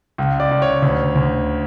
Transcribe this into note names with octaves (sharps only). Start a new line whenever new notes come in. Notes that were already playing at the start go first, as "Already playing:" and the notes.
C#2
D5
C#2
C#5
D2
D2